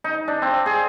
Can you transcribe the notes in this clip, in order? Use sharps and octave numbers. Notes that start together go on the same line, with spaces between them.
D#4
D4
C4
G#4